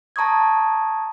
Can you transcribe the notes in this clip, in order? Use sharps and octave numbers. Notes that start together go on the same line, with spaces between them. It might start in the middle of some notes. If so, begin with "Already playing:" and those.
A5 A#5 C#6 D#6 G#6